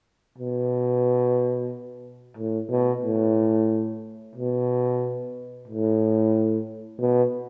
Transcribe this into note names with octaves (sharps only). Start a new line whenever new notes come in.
B2
A2
B2
A2
B2
A2
B2